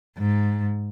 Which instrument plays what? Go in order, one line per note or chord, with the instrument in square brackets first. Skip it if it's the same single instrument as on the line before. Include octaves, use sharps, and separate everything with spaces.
[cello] G#2